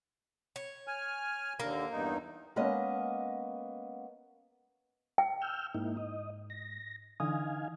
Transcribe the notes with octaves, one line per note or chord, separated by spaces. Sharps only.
C#5
G#5 F6
D#2 D3 A#3
E2 G2 D#4
G#3 A#3 B3 C#4 D#5
G5
E6 F6 G6
G#2 A#3 D#4 E4
D#5
A#6
D3 E3 D#4 F5 G#5 D#6